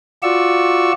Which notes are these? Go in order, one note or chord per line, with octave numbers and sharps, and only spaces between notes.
F4 F#4 D5 C#6 E6